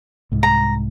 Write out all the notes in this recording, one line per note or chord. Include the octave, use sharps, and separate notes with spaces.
C2 G#2
A#5